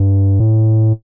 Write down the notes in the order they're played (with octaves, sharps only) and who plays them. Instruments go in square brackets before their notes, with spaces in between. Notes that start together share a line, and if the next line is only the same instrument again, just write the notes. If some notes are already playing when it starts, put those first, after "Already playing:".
Already playing: [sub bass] G2
A2